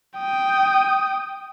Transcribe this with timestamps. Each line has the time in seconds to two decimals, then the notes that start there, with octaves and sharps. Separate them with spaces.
0.18 G5 D#6